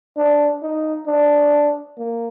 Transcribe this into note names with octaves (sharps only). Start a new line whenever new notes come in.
D4
D#4
D4
A#3